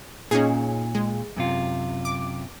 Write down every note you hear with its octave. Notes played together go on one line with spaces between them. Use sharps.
A#2 C#4 D#4 G#4
G#3
F#2 C3 F4
D6